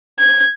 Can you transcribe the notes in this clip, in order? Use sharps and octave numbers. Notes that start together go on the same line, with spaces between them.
G#6